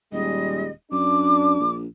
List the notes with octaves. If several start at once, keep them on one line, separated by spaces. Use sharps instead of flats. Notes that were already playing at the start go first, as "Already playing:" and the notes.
D#1 G3 G#3 D#5
F#2 D4 D6
A#1